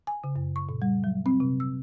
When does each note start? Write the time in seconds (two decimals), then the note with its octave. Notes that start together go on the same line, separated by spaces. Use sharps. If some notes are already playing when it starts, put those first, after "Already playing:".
0.07 G#5
0.24 C#3
0.36 F#2
0.56 C#6
0.69 A#2
0.82 G3
1.04 F#3
1.26 C4
1.40 C3
1.60 E6